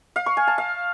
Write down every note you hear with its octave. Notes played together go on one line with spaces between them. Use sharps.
F5
C#6
G#5
A5
F5